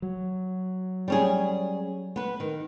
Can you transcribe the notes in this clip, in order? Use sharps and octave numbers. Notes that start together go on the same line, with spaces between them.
F#3
G3 C#4 G#4
B3 B4
D#3